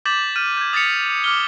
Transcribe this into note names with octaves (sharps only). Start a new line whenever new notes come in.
D6 G6 A6 B6 E7 F#7
F6 G6 D#7
G6 G#6
D#6 A6 B6 C#7 F7
D6 F6 G7